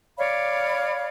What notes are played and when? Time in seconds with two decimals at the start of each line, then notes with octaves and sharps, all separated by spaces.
0.18 C#5 D5 F5 B5